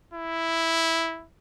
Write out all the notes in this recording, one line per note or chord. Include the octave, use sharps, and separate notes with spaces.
E4